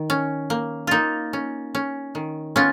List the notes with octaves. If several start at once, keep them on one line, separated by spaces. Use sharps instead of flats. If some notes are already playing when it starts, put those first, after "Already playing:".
Already playing: D#3
C#4
A#3
A#3 D#4 F4
C#4
C#4
D#3
B3 C#4 F4